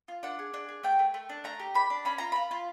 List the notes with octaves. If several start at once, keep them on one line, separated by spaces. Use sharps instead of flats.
F4
D4 F#5
G#4
D4
G#4
A3 G5
A3
A3
D4
A3 A#5
G4
D4 B5
D4
C#4 B5
F4 A#5
F4 B5
F4